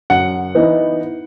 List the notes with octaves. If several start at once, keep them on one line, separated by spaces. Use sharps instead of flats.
F#2 F#5
E3 B3 D#4